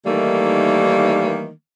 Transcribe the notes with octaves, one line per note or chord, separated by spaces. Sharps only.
D#3 E3 G3 A3 A#3 D#4